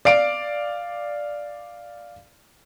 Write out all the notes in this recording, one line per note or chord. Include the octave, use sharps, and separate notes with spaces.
D5 F5 D7